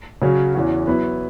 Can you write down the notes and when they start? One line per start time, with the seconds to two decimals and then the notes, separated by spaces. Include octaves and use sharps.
0.22 C#3 F#3 C#4 F#4
0.54 E2 E3 C#4 F#4
0.87 F#3 B3 E4 B4